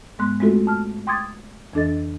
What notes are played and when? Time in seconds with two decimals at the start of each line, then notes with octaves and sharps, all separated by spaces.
0.19 G#2 G#3 B3 C6 F#6
0.40 G#3 A3 C4 F4 F#4 A4
0.67 A5 F6
1.07 G5 C6 D6 D#6 G#6 A6
1.73 F2 E3 D4 A4 D#5 A6